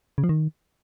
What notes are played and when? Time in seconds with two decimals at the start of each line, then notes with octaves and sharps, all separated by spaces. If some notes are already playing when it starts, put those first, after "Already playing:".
0.18 C#3
0.24 F3
0.29 D#3